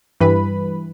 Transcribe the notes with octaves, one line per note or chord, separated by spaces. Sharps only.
G2 E3 B4 B5